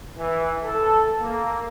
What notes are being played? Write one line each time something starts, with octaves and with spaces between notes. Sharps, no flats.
E3
A4
A#3